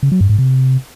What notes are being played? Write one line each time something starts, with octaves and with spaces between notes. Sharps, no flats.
C#3
F#3
G2
G#2
C3